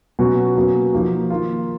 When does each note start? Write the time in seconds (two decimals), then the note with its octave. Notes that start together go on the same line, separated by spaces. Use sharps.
0.19 B2 F#3 C#4 F#4
0.56 B2 F#3 A#3 C#4 F#4
0.93 F3 A#3 D#4 F#4
1.30 D#3 A#3 F4